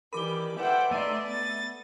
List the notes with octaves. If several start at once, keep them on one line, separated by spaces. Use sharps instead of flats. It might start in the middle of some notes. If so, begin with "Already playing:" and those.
D#3 E3 G3 A#4 B5 D6 G7
A4 B4 C5 E5 F#5 G5
A3 D#4 D5 E5 C6 D#7
B3 A6